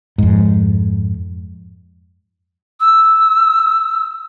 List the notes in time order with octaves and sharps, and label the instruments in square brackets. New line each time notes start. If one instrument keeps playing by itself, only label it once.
[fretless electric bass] F2 G#2
[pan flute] E6